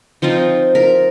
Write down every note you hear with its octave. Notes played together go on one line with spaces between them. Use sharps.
F3 C4 D#4 F4
A#4